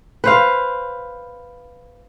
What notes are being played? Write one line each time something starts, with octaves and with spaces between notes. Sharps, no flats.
B4 C5 F5